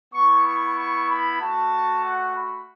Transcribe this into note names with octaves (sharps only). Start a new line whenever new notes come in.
B3 E4 C#6
C#6
C#6
B5
A3 F#4 A5
F#5
B5